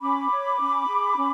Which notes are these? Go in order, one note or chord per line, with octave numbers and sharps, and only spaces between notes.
C#4 B5 D6
C#5
C#4
G#4
C#4